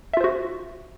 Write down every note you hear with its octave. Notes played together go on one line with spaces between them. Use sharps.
F4 F#4 C5 E5